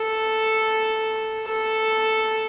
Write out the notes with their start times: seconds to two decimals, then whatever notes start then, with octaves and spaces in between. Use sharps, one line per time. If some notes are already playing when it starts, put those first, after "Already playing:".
Already playing: A4
1.47 A4